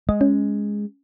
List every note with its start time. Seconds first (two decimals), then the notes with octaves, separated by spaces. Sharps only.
0.09 G#3 D#5
0.21 C#4